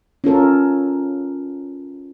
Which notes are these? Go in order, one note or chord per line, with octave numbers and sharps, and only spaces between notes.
C#4 F4 A4 A#4